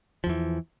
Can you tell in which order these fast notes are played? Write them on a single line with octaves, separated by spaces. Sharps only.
F3 E2 E3